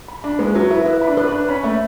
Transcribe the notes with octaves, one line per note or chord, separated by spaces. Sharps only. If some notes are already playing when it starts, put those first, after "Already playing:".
B5
D4 B5
G#3 B4
F#3 B4
E4 B4
E4 B4
B5
D4
B4
D4 B4
C#4 B5
A3 B5